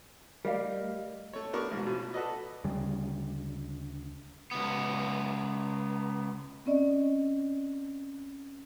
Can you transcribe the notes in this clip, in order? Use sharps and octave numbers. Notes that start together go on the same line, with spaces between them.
G3 A3 A#4 D5 D#5 F5
A3 C#5
B3 D4 A#4 C#6 D6
A1 G#2 B2
B2 F3
F#4 A4 B4 D5 D#5
D2 C#3 G3
C#2 B3
C4 C#4 D5 D#5